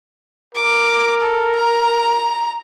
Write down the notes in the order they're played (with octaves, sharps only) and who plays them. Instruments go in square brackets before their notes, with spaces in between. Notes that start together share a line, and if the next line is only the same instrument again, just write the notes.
[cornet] A#4 [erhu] D6
[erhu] A4
A#5